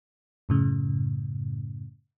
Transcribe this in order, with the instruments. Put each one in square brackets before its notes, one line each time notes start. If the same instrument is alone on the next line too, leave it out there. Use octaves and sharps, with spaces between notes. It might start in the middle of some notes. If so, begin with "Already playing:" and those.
[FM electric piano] F#2 A2 C#3